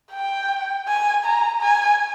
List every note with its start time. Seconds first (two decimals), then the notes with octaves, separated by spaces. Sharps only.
0.13 G5
0.88 G#5
1.25 A#5
1.62 G#5